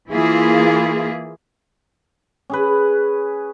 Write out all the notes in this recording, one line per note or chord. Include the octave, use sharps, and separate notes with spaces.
E3 A#3 E4 F4 G#4
C#4 G#4 B4